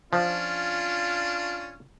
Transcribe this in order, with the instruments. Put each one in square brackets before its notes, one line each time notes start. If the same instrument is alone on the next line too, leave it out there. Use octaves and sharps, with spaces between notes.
[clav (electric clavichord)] F3 [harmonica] C#4 D4 [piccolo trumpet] F4